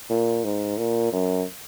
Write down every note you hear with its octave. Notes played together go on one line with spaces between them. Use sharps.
A#2
G#2
A#2
F#2